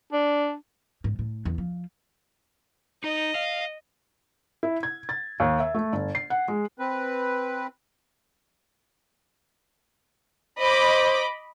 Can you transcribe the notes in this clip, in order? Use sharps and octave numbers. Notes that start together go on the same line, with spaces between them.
D4
G#2
A2
E2
F3
D#4 D#5
F5
E4
G#6
A6
D#2
E5
A3
G1
C7
F#5
G#3
C4 B4
C5 D#5 B5 D6